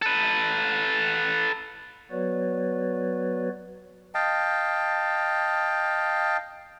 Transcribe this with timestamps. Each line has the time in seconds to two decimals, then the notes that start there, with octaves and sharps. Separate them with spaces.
0.02 A4 B4
2.11 F#3 B3 F#4 B4 C#5 D5
4.14 D#5 F5 G5 A5